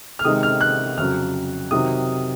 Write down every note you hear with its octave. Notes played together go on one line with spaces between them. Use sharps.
F6
C3 D#3 G#3 D#6
F6
F#6
F2 C#3 F#3 F6
C3 D#3 F#3 D#6